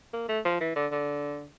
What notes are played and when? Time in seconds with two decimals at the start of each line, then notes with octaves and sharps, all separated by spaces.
0.13 A#3
0.29 A3
0.45 F3
0.61 E3
0.76 D3
0.92 D3